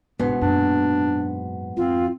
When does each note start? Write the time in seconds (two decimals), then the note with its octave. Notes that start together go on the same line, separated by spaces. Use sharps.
0.19 G1 G#2 B2 B3 D4
0.41 F#2 A#2 D4
1.77 F2 C4 F4